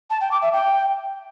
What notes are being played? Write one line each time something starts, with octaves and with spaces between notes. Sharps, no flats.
A5
G5
D6
E5
G5